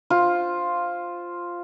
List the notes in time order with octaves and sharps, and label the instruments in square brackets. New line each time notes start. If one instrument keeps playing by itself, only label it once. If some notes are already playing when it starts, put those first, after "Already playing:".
[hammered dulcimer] F4 C5